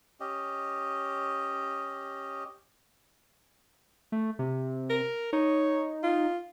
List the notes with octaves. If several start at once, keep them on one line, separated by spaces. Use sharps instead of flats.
C#4 G4 D#5
A3
C3
A#4
D#4 C#5
F4